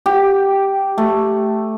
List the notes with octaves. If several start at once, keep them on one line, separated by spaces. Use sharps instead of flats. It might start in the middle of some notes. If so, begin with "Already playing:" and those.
G4
A3